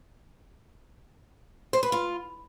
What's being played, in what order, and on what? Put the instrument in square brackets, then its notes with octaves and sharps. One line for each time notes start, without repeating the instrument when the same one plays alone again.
[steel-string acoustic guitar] C5
B4
F4